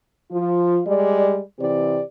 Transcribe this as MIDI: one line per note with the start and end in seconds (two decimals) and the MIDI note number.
0.31 0.80 53
0.31 0.80 65
0.87 1.40 55
0.87 1.40 56
0.87 1.40 74
1.60 2.00 48
1.60 2.00 52
1.60 2.00 60
1.60 2.00 67
1.60 2.00 74